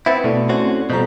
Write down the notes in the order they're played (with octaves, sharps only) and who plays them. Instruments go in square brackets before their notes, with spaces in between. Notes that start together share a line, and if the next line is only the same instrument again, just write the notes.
[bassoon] B3 [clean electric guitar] C4 E4 [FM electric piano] E5 A6 C#7
[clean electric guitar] B2 [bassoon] D3 [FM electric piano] A3 E4
[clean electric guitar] C4 C#4 F#4
[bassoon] F2 [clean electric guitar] B2 F3 G3 [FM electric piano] A#5 G6